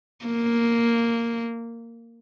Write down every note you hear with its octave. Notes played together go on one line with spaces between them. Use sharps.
A#3